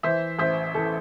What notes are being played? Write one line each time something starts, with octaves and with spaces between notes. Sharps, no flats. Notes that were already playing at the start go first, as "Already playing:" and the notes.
E3 C5 E5
A1 C5 E5
E3 A4